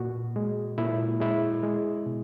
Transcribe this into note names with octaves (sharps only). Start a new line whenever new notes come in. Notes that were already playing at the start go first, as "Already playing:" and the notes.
Already playing: A#2 F#4
G#3
A#2 E4
G#3 E4
G#3
B2